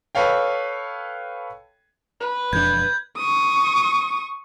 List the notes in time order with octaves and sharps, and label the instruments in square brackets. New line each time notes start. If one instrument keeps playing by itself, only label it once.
[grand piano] A4 B4 C#5 F5 G5
[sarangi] B4
[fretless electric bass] E1 F2 D4 [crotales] G6 G#6
[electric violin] C#6 D#6